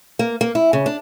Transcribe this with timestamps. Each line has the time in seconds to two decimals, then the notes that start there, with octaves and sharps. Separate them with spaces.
0.19 A#3
0.41 A#3
0.55 E4
0.73 C#3
0.86 D4